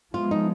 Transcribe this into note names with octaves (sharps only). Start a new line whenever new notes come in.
F3 G#3 B3 F4
D#4